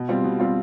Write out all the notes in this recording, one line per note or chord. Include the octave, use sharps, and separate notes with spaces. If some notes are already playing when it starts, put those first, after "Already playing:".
Already playing: B2
G3 C4 F4
B2
G3 C4 F4